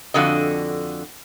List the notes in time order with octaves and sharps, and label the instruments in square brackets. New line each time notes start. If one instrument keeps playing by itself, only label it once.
[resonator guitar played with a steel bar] F2 D3 F#4 D#5